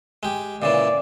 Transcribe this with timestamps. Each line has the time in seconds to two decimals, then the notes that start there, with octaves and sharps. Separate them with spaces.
0.23 G#3 G4
0.62 A#2 C#3 E3 D5